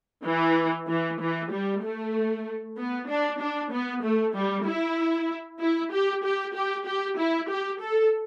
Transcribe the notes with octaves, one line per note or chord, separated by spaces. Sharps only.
E3
E3
E3
G3
A3
B3
D4
D4
B3
A3
G3
E4
E4
G4
G4
G4
G4
E4
G4
A4